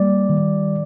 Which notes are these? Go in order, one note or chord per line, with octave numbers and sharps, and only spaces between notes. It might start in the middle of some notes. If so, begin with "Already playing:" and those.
Already playing: G3 A#3 D5
D#3